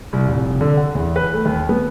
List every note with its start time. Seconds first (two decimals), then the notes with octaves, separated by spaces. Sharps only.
0.13 C2
0.28 F1
0.61 D3
0.77 F#5
0.95 E2
1.16 B4
1.33 A3
1.45 D#2
1.69 B3